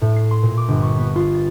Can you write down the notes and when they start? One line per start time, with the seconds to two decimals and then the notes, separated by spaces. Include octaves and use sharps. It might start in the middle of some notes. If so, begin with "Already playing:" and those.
0.01 A2
0.16 C7
0.31 C6
0.43 A#2
0.57 D6
0.68 G1
0.83 C#6
0.97 B3
1.16 F4
1.35 A6